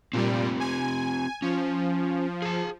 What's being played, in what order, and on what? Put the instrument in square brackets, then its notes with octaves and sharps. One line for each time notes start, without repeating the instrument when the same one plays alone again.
[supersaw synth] A#2 G3 [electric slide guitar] C4 F4 G4
[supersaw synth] G#5
[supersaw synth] F3 [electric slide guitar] C#4
[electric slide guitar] G#4 A5